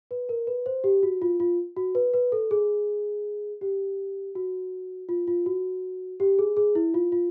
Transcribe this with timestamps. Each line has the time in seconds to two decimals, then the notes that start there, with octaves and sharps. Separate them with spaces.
0.11 B4
0.29 A#4
0.47 B4
0.66 C5
0.84 G4
1.03 F#4
1.22 F4
1.40 F4
1.77 F#4
1.95 B4
2.14 B4
2.32 A4
2.51 G#4
3.61 G4
4.35 F#4
5.09 F4
5.27 F4
5.46 F#4
6.20 G4
6.39 G#4
6.57 G#4
6.75 E4
6.94 F4
7.12 F4